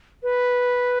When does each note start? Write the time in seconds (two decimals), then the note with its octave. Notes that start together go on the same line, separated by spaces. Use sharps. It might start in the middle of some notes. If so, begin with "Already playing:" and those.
0.23 B4